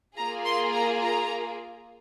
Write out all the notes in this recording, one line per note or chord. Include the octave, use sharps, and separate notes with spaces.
A#3 F4 G#4 A#5
C6
A#5
A#5